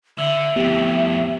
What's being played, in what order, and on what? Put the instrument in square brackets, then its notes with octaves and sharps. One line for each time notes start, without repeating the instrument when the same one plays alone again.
[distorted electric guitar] D3 [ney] E5 [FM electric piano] E6
[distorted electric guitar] F2 A2 [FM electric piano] B3 G4